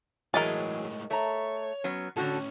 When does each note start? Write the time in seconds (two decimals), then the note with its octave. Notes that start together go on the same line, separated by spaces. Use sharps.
0.34 A2 E3 F#3 G#3 G#4 A#4 D#5 A5
1.11 A3 C#5 A#5
1.84 F#3 B3 C#4
2.16 A2 D3 C#4 F#4 A4